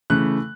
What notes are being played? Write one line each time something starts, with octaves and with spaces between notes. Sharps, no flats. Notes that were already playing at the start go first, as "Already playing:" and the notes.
C#3 E3 A3 F#6